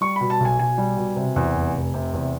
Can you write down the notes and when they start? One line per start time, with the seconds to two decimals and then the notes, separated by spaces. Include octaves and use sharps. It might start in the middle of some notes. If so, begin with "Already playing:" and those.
0.01 G3 C#6
0.16 B2 B5
0.30 A5
0.40 B1 G#5
0.59 B1 G#5
0.78 G3
0.97 B2
1.16 C3
1.36 E2
1.55 F1
1.75 F1
1.94 C3
2.13 E2